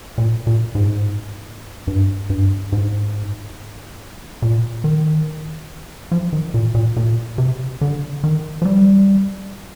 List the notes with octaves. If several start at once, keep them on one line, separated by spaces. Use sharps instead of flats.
A#2
A#2
G#2
G2
G2
G#2
A#2
D#3
F3
D#3
A#2
A#2
A#2
C3
D3
D#3
F3
G3